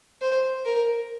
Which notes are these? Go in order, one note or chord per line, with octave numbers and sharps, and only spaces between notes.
C5
A#4